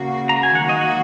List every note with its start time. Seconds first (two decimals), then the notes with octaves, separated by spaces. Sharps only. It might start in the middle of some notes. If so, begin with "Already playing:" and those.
Already playing: C#3 A#3 F#4
0.29 A#5
0.43 G#5
0.55 D#3 F#3 A#3 F#4 F#5
0.69 D#5
0.81 F#5